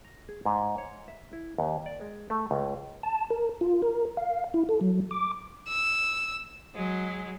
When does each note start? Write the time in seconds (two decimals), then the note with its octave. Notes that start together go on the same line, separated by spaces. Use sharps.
0.05 A#5
0.29 G#4
0.45 G#2
0.78 C#5
1.08 E5
1.33 E4
1.58 D#2
1.86 D5
2.01 G#3
2.30 A3
2.51 C#2
3.03 A5
3.30 A#4
3.61 F4
3.82 A#4
4.17 F5
4.54 E4
4.69 A4
4.81 F#3
5.11 D6
5.68 E6
6.76 F#3 G#3